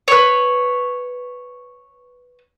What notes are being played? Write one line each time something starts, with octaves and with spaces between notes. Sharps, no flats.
B4 C#5